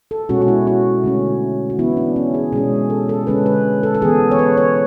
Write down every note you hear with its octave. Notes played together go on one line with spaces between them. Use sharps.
A4
B2 G#3 C#4 F#4
F#4
E4
F#4
D3 A3 C#4
F#4
E3 B3 E4
D4
C#4
G#4
B2 G#3 C#4 G#4
A4
A4
D3 G#3 C#4 B4
B4
A4
A4
E3 B3 G#4
C#5
B4
C#5